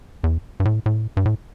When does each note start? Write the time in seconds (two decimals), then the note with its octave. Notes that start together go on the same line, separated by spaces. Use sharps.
0.24 E2
0.60 G2
0.65 A2
0.86 A2
1.17 G2
1.25 A2